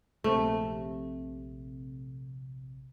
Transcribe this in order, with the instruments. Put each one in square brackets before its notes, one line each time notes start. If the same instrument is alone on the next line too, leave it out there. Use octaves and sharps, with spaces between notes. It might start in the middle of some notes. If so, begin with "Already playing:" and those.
[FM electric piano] A#1 C3 [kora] A3